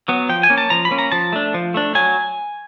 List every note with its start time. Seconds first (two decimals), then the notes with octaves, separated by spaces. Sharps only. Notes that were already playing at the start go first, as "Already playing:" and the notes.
0.08 F#3 B3
0.29 F3 G5
0.43 G#5
0.50 A#3 C#4
0.58 A5
0.70 F3 A#5
0.85 B5
0.91 A#3 C#4
0.99 A#5
1.12 F3 A5
1.33 A3 D4
1.54 F3
1.74 A3 D4
1.95 F#3 G#5